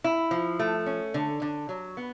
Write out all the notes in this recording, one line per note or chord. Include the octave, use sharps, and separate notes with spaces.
E4
F3
A3
C#4
D3
D3
F#3
B3